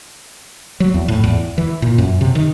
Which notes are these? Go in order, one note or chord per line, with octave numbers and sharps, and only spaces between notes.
F#3
E2
A2
E2
E3
A#2
F#2
C3
D#3